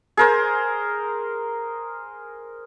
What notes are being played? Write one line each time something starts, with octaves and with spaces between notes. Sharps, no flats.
G#4 A#4 C5